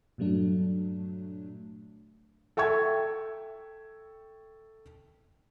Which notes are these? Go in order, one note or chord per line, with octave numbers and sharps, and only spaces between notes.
G2 A#2 F#3 A3 D4
A4 E5 G5 C#6 G#6